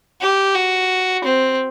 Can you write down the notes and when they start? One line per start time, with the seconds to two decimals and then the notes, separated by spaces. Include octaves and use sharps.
0.21 G4
0.55 F#4
1.24 C4